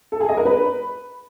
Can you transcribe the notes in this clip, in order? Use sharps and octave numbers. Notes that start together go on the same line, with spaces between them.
A4
G#4
D#5
A#4
B4